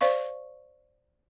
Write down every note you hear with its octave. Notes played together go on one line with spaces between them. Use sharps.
C5 D5 F5 C#6